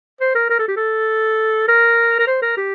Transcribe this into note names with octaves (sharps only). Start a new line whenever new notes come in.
C5
A#4
A#4
A4
G4
A4
A#4
A#4
C5
A#4
G4